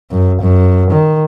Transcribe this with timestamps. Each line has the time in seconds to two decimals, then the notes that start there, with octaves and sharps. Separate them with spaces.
0.11 F#2
0.41 F#2
0.91 D#3